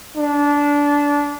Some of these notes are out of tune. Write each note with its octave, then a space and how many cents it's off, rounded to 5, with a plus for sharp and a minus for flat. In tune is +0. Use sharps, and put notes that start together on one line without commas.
D4 -20